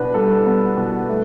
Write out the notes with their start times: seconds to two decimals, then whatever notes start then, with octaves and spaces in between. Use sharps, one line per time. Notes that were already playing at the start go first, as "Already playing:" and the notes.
Already playing: B2 D4 B4
0.14 G3 A4
0.46 B3
0.77 B2
1.09 A3